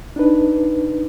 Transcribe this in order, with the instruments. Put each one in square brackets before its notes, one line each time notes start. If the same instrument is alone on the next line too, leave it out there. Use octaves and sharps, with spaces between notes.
[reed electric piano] D4 D#4 B4